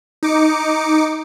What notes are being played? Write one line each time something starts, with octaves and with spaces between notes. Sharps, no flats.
D#4 D6 C#7